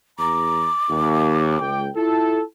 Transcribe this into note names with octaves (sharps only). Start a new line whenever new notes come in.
E2 A#5 D6
D#2
C#2 G5
E4 F4 A4